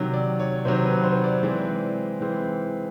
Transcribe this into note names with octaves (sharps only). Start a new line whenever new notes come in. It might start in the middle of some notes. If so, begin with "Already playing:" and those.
Already playing: C3 D#3 F#3
D5
C#5
C3 D#3 F#3 C5
B4
C5
D5
E3 G#3 C4 D5
E3 G#3 C4